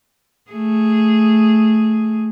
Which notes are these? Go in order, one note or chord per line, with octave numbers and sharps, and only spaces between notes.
A3 G#4